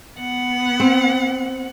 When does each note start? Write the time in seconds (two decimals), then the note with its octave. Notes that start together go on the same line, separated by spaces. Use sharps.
0.16 B3 F#5
0.80 C4